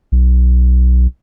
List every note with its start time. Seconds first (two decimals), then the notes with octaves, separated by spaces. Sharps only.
0.12 B1